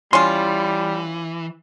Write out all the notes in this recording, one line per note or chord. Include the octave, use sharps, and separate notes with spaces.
E3 G3 C#4 F4 C6